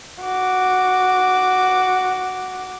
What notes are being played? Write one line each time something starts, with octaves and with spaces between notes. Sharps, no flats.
F#4 D6